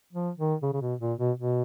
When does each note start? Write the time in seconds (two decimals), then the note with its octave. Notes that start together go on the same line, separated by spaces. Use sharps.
0.13 F3
0.38 D#3
0.63 C#3
0.73 C#3
0.81 B2
1.01 A#2
1.19 B2
1.38 B2